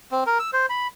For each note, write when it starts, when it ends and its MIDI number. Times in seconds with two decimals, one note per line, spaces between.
0.12 0.24 60
0.27 0.38 70
0.39 0.51 88
0.53 0.66 72
0.70 0.87 83